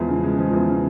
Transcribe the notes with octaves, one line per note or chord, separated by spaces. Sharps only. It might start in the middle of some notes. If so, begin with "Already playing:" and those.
Already playing: E2 F3 G#3
C#3
G#3
F3
E2
C#3